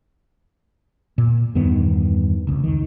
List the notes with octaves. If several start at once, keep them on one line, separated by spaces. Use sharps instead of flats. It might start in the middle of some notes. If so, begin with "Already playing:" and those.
A#2
E2 G2 D#3 B3
F1 C#2
D#3